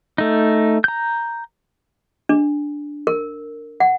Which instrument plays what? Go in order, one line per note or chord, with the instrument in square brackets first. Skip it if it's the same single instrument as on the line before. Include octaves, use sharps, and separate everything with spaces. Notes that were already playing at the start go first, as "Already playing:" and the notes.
[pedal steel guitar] A3 D#4
A#5 G6
[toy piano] D4
A#4
F#5